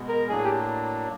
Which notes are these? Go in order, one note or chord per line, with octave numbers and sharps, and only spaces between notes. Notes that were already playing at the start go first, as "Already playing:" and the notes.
Already playing: B2 G#3 B3
A#4
A2 F#3 A#3 D4 G#4
G4